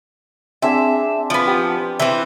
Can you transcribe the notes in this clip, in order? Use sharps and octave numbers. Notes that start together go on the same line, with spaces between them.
C4 D4 G#4 E5
F3 B3
G4
E3 C4